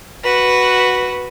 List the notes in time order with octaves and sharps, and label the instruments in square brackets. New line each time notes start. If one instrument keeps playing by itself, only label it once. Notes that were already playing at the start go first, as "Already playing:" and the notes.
[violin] F#4 B4